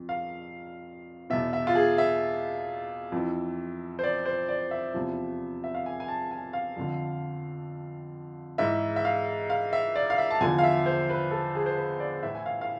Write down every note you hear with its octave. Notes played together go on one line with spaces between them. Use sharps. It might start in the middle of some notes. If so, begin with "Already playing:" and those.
Already playing: F2
F5
E2 B2 E5
E5
F4
G#4
E5
F2 E3
C5
D5
C5
D5
E5
E2 C3 F3
E5
F5
G#5
G#5
A5
G#5
F5
F2 D3 F3
G#2 E3 E5
E5
F5
F5
E5
D5
F5
E5
A5
E2 D3 F3 G#5
F5
E5
C5
B4
A4
G#4
C5
B4
D5
A2 E3 E5
G#5
F5
F5